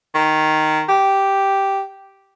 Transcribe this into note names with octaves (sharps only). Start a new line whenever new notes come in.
D#3
G4